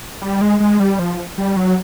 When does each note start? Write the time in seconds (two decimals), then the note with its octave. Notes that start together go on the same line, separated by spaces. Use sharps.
0.22 G3
0.41 G#3
0.60 G#3
0.80 G3
0.99 F3
1.38 G3
1.57 F#3